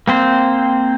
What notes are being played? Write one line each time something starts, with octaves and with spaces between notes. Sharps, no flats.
A#3 C4 C5